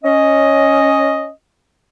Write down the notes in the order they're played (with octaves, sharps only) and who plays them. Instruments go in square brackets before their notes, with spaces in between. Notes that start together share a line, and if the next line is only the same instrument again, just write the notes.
[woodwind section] C#4 D#5